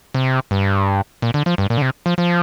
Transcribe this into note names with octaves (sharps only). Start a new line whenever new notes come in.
C3
G2
A#2
D3
F3
G2
A#2
D3
C3
F3
F3